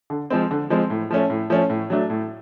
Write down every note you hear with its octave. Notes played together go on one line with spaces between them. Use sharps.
D3
F3 G#3 C4
D3
F3 G#3 C4
A2
F3 A3 C#4
A2
F3 A3 C#4
A2
F#3 A3 D4
A2